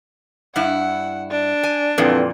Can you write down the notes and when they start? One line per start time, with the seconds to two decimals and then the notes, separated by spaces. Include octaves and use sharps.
0.56 G2 E4 F#5
1.31 D4
1.63 G#5
1.98 F2 A#2 D3 E3 C4